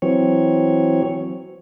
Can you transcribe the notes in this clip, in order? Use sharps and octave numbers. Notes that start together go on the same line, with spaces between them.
E3 F#3 C4 C#5